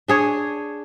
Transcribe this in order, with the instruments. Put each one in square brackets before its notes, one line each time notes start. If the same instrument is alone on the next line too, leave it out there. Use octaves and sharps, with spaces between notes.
[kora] D4 G#4 C#5